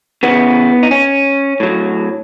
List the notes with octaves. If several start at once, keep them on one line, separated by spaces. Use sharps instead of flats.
C#3 E3 B3
D#4
C#4
A2 F#3